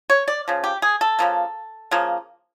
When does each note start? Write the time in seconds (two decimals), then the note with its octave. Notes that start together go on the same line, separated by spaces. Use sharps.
0.10 C#5
0.28 D5
0.48 C#3 F3
0.64 G4
0.82 G#4
1.01 A4
1.19 C#3 F3 A#3
1.91 C#3 F3 A#3